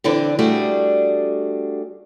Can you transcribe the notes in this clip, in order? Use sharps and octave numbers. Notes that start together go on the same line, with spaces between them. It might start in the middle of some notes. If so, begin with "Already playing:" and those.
D3 E3 C4 D4
G3 A3 D4 F#4 G#4